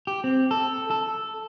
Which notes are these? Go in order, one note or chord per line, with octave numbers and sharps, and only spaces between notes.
G4
C4
A4
A4